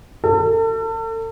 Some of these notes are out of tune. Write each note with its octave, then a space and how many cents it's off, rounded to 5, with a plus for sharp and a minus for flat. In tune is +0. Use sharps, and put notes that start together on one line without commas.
A4 +40